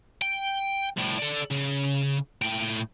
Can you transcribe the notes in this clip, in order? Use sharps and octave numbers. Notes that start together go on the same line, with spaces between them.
G5
C2 A2
A4 D5
C#3
A2 G5